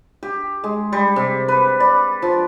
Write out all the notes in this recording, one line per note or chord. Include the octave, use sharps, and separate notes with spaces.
G4
G#3
G3
C3
B4
D5
F3